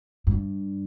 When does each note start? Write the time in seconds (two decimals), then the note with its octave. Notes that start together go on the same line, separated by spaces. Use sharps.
0.27 G2